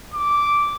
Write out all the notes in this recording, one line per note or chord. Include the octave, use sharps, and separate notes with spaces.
D6